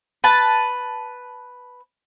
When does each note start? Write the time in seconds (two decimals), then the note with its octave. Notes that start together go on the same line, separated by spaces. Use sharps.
0.24 B4 A5